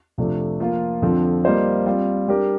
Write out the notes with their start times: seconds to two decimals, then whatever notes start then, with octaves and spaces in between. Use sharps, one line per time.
0.18 F2 C3 F3 A3 D4
0.60 F3 A#3 F4
1.02 F2 D3 F3 C4
1.44 G3 A#3 F4 C5 D#5
1.86 G3 C4 F4
2.28 G3 D4 G4 A#4 D5